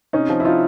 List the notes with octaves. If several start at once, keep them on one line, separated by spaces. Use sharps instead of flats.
C3 C#4 D#4
F3
E4
D#4 F4